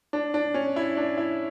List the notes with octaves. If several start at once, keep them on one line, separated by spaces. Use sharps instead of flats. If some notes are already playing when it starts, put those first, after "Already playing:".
D4
D4
C#4
E4
D4
E4